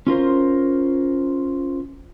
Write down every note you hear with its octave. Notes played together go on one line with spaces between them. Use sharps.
C#4 F4 A#4 C5